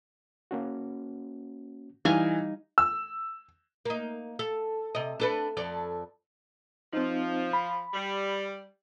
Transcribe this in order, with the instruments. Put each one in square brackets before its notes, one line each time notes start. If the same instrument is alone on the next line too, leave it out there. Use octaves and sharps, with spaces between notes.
[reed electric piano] A#3 C#4 F#4
[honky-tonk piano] E3 [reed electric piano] G3 [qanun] D#4 F5 G#5
[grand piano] E6
[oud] A#3 D#4
A4
C3 D#5
D4 A4 B4
F2 A4 D5
[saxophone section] F3 [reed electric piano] C4 D#4
[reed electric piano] B5
[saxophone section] G3